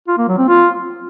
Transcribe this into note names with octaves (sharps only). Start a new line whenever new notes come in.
F4
A#3
F#3
C4
F4